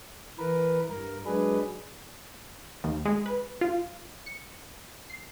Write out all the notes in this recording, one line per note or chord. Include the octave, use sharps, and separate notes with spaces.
E3 A#4 B4
G2 A#4
F#3 G#3 D4 G#4 B4
D#2
G#3
B4
F4
C#7
C7